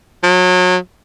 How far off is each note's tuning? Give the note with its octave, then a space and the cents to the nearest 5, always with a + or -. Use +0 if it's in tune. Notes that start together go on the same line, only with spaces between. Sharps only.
F#3 -30